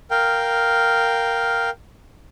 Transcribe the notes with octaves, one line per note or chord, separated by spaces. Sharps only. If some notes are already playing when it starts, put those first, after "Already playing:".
A#4 F5 G5